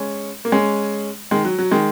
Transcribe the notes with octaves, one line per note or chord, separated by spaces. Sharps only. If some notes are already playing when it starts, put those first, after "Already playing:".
Already playing: G#3 C#4
A#3
G#3 C#4
D#3 G#3
F#3
F#3
D#3 G#3